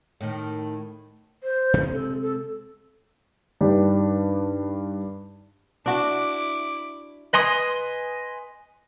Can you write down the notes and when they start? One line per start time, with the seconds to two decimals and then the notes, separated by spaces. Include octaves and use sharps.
0.21 A2 D#3
1.42 C5
1.74 C3 G#3
1.92 A4
2.22 A4
3.61 G2 D#3 D4 G4
5.86 D4 E4 F#4 D6
7.33 B4 D#5 G#5 C6 D#6